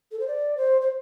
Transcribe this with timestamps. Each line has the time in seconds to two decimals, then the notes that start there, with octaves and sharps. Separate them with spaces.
0.11 A4
0.19 C5
0.27 D5
0.57 C5
0.81 C5